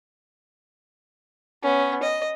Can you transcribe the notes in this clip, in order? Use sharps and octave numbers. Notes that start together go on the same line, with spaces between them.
B3 C#4
D#5